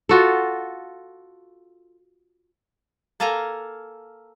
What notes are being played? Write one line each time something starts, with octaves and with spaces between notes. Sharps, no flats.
F4 F#4 A4
A#3 A4 F5 G#5 A#5